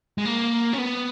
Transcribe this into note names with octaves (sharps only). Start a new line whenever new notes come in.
G#3
A#3
C#4
B3